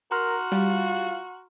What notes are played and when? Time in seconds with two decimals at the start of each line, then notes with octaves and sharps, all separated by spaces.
0.11 F#4 A#4 A#5 C6 F6
0.52 G3 F4